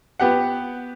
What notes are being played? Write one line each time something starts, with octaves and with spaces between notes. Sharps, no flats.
B3 G4 F#5